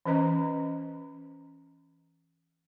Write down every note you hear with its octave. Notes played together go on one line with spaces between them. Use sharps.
E3 C#4 B4 D#5 A#5